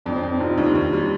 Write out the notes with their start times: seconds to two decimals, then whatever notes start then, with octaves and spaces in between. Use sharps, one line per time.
0.06 F2 D4
0.13 C4
0.19 D4
0.23 F2
0.31 C4 D#4
0.40 F1 D4 F4
0.58 D#2 D#4 G4
0.75 D#2
0.93 G3